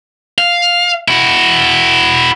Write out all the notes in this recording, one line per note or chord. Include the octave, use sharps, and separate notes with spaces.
F5
E4 F#4